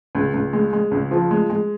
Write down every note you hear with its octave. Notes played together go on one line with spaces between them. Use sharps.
C#2
C#2
G#3
G#3
C#2
F3
G#3
G#3